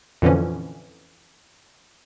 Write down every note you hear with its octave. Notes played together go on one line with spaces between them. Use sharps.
F2 A#2 D3 E3 F3 C#4